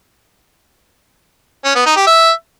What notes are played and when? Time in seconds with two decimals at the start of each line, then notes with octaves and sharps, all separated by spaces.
1.65 C#4
1.75 B3
1.86 D#4
1.97 G4
2.07 E5